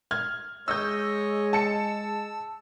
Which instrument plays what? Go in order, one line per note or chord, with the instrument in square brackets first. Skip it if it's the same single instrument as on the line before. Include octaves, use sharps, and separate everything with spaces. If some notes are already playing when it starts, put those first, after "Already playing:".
[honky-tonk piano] F6 G#6
[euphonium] G#3 [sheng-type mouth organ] C#5 D#5 [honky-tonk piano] E6 G6
[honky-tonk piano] A5 C#7 [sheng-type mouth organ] E6